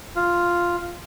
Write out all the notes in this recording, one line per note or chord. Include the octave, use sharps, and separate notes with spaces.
F4